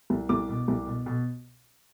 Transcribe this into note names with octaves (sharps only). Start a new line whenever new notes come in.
C2
C2 D6
B2
C2
B2
B2